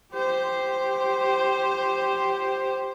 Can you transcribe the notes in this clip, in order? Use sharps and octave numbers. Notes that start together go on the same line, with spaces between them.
G4 C5